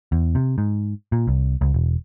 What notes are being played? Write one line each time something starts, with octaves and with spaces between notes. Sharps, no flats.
E2
C3
G#2
A#2
C2
C#2
E1